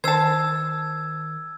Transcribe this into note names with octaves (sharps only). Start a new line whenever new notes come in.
D#3 C5 A5 E6 G#6